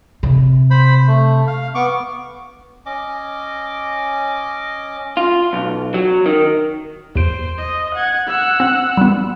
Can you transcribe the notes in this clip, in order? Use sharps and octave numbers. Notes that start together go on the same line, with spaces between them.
C3
C5 B5
A3
F5
B3 C#6 D6
C#4 D#5 D6
F4
B1
F#3
D#3
E2 C5 D7
D#5
F#5 G#6
F#5 E6
C4
G3 B3